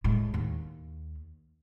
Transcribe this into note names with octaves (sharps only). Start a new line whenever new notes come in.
A2 G#3
D#2